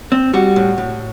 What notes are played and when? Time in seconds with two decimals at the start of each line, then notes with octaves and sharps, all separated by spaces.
0.12 C4
0.34 G3 F#4
0.56 A2
0.78 A2